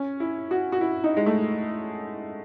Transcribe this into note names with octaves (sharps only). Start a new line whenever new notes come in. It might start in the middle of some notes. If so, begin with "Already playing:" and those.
Already playing: C#4
E4
F#4
F#4
E4
D#4
G#3
A3